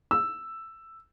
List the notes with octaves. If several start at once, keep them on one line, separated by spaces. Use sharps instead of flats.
E6